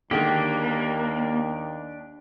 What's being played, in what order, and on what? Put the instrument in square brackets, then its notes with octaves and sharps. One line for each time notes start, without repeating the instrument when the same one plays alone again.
[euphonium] D#2 [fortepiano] D3 D#3 G#3 [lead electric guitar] A#3 [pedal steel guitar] D4 G4